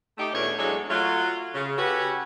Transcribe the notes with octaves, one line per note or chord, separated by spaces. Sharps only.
A3 D#4 G4
E2 B2 A3 C#4 D4 C#5
E2 F#3 G#3 D4 A4 C#5
F#3 A3 F4
C#3
C#4 F#4 G4 A4 B4 C#5